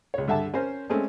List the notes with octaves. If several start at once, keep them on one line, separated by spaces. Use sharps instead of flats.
C#2 C#5
G2 D3 E5 F#5 A5
C#4 A#4 C5
G#3 A3 C4 C#4